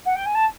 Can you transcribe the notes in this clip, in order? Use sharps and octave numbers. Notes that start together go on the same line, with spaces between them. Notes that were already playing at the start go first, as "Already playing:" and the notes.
F#5
G5
G#5
A5